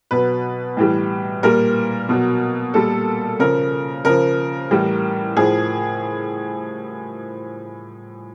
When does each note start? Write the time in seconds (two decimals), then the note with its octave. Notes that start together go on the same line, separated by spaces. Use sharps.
0.11 B2 F#3 B4
0.77 A2 E3 G3
1.43 A#2 G3 A#4
2.09 B2 F#3
2.74 A#2 G3 A4
3.39 C#3 F3 A#4
4.05 C#3 F3 A#4
4.71 A2 E3 G3
5.36 A2 F3 G#4